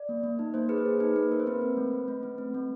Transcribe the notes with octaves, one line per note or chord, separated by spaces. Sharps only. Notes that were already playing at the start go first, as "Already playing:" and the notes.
Already playing: D5
A#3
A#3
D#4
A#3 C5
G#4 B4
C5
G#4
D#4 B4
A#3 B4
A#3 A#4
C5
C4 B4
C4
A3
A3
A3
C4
C4
A3